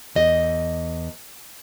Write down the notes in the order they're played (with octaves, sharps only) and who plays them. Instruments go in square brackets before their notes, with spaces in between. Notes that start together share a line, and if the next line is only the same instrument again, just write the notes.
[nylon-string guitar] E2 D#5